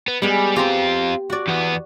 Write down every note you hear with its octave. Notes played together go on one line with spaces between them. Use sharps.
B3
G3 G#3 B3
C4 F4 G4 A#5 C6
F#4 D5
E2 B3